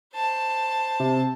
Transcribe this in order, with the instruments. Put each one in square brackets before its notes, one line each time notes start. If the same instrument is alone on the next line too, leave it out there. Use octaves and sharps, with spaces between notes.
[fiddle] C5 A5
[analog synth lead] C3